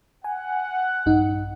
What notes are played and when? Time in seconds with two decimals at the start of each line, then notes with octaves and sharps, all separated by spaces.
0.24 F#5 G#5
1.06 A#1 G2 D#4